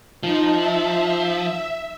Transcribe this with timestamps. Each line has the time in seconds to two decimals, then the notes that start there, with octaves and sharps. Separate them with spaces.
0.23 F3 D#4
0.55 E5